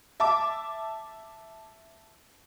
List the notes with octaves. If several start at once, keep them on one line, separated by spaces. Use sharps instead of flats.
E5 A5 D6